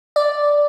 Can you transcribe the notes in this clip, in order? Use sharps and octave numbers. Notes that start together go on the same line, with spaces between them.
D5